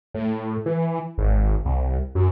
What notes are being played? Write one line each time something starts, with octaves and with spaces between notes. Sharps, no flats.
A2
E3
G#1
C2
F#2